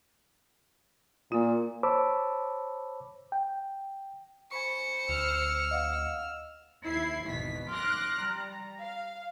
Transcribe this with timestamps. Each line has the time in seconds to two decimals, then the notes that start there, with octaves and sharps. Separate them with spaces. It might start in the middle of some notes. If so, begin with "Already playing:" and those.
1.32 A#2 A#3 F4
1.83 C5 C#5 A5 B5 D6 E6
3.32 G5
4.51 C5 G#5 B5 C#6 C#7
5.09 D2 E6 F6
5.71 D#5 F5 F#5
6.85 D#2 E4 G#6 C7
7.28 G#1 E2 B2 B6
7.71 C6 D6 F6 F#6 A#6
8.23 G3 A#5
8.82 F5